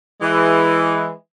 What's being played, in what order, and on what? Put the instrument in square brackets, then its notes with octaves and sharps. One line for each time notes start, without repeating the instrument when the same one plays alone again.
[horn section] E3 G#3